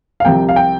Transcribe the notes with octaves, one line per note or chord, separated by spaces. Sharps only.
F5
C2 C3 F3 G5
F5
G5